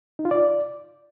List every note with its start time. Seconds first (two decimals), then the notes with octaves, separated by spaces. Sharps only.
0.19 D#4
0.25 F4
0.31 D5